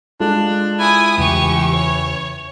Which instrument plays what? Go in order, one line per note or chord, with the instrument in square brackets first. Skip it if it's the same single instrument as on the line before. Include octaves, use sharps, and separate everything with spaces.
[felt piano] G#3 F4 A4 [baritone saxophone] D4
[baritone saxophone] E4 [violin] G#5 D#6
[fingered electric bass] E2 C#3 [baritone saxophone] E3 [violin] G4 C#6
[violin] C#5